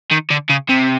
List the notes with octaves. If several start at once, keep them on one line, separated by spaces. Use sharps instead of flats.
D#3
D3
C#3
C3